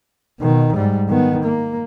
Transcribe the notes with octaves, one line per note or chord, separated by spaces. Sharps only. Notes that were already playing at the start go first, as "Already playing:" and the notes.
B2 D#3
G#2 G3
D#3 B3
A#3